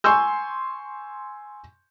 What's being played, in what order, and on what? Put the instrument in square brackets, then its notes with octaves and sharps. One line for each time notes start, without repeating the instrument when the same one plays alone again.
[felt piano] G#5 C6 C#6 E6 G6